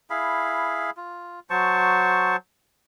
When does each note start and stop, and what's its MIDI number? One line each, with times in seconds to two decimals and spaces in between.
0.10 0.90 64
0.10 0.90 68
0.10 0.90 77
0.10 0.90 83
0.97 1.40 65
1.50 2.36 54
1.50 2.36 72
1.50 2.36 81
1.50 2.36 85